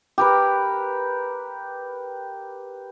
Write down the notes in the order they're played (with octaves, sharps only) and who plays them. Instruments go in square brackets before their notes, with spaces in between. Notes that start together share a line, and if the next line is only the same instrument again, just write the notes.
[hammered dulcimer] G4 A#4 B4